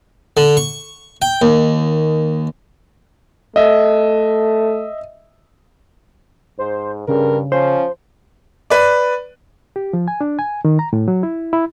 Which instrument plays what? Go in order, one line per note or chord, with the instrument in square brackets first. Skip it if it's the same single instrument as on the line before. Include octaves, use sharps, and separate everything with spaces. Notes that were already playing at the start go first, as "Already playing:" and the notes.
[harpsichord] D3
C#6
G5
D#2
[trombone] A3 [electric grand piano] D#5 E5
[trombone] G#2 [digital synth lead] C5
[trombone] G2 [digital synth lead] C#3 [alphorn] A#4
[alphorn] F3 [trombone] C#4 [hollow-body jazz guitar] C5
[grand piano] B4 D5
[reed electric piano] G4
F3
G#5
D4
G#5
D#3
A#5
A2
F#3
E4
E4